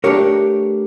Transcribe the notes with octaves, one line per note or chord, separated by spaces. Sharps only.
A3 D4 G4 A#4 C#5